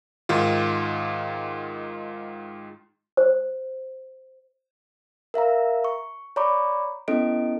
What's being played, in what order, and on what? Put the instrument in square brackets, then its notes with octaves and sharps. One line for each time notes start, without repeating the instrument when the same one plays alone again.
[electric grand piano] G#2 D#3 F4
[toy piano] C5
[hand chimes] A#4 E5 F5 A#5
C#6
C#5 D5 A#5 B5 C#6 D6
B3 C#4 E4 A4 D#5 D7